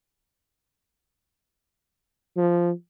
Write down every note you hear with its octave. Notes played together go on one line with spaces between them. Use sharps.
F3